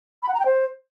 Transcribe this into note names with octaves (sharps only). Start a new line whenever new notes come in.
B5
F#5
A#5
G5
C5